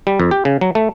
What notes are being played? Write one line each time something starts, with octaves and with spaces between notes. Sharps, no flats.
G3
F2
G4
C#3
F#3
A3